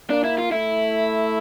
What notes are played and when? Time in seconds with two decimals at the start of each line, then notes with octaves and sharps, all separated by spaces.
0.10 A#3 D4
0.24 E4
0.38 F4
0.52 A3 E4